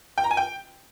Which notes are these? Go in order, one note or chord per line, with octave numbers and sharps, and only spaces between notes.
G5
A#5
G#5
G5